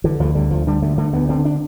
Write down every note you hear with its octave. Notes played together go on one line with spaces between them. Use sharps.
D3 E3
D2 F3
D3 G3
D2 F3
D3 G3
D2 A3
D3 A3
D2 B3
D3 C4
D4